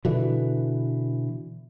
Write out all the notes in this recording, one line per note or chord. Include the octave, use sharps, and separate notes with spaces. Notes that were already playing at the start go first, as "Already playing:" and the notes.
B2 D3 E3